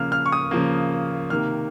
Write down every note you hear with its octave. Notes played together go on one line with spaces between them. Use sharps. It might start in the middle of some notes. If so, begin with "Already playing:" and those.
Already playing: C#3 F3 A#3 F6
F6
C#6
D#6
C#3 F3 A#3
C3 D#3 A#3 F6